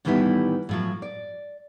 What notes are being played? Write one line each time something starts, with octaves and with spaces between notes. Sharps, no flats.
A2 D#3 E3 G3 B3 E4
A2 F3 F#3
D5